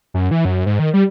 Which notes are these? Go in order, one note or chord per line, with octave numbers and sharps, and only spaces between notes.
F#2
E3
F#2
G#2
D#3
G3